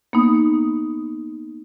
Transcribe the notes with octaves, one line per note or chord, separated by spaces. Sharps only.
A#3 B3 D#4 D#6